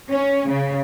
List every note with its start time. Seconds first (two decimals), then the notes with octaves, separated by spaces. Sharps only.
0.11 C#4
0.50 C#3